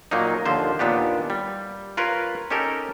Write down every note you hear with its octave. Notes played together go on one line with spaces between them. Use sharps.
A#2 F#3 A#3 D#4
D#2 D3 F3 C5
D#2 A#2 B3 D4 G4
G3
F4 A#4 B4 C#5
C#4 D#4 G4 A4 A#4